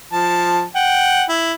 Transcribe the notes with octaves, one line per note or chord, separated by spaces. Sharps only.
F3 A5
F#5 G5
E4